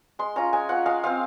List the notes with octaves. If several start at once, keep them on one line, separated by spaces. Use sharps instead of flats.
G#3 C6
C#4 F4 A#5
G#3 G#5
C#4 F4 F#5
G#3 F5
C4 F4 F5